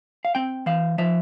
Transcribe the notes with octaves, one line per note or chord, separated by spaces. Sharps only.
F5
C4 G5
E3 F5
F3 E5